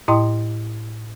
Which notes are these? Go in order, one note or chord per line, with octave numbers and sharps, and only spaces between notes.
A2 E4 D#5 G5 C6 D#6